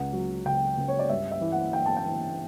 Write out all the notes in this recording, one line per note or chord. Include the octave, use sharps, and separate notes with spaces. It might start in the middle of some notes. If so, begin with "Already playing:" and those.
Already playing: C#2 F#5
F#3
C#3 G5
C#2
C#5
D5
G2 E5
E5
E3
F#5
E3 G5
A5
G5
E3